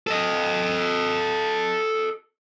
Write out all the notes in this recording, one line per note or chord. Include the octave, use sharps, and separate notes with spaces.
A4 D#5